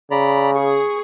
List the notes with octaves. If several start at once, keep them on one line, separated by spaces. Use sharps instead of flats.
C#3 D5 A#5 B5
G#4 C#6